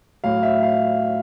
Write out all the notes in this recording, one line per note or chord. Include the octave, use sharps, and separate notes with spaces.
A2 F#3 F5
E5
F5